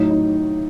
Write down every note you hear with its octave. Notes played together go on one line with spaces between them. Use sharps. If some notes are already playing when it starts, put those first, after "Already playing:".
Already playing: A2 F#3 D#4
D#4